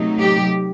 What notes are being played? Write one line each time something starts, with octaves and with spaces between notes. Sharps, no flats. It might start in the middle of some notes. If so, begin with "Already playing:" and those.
Already playing: C3 F#3 A3 D#4
G4